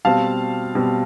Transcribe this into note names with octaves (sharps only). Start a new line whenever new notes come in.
B2 G3 C4 F5 A5
B2 G3 C4